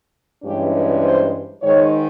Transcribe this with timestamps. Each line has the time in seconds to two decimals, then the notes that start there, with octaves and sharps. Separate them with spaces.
0.43 G2 E3 G#3 C#4 G4
1.03 C5
1.62 G#2 D#3 G#3 C#5